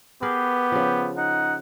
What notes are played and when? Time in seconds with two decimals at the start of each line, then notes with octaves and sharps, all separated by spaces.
0.22 B3 G4 G#4 A#4 B4
0.72 C#3 F3
1.17 D#4 F#5